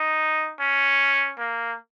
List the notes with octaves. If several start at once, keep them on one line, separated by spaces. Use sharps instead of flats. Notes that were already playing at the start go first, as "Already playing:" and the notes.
Already playing: D#4
C#4
A#3